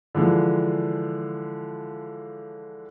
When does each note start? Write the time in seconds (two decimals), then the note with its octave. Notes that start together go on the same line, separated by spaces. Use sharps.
0.15 D3 E3 F3 G#3